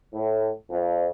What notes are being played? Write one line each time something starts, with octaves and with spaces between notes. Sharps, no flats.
A2
F2